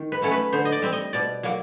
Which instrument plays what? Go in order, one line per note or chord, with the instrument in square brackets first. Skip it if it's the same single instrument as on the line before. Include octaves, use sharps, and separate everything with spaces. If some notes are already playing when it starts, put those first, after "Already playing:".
Already playing: [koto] D#3
B4
F#3 A3 C#4
B4
D3 C5
D#5
D5
G3 C4
D#5
B2 D5
F#3 A#3